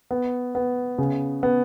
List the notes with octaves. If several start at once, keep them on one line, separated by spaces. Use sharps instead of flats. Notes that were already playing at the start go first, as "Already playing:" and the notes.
B3
B3
C#3
B3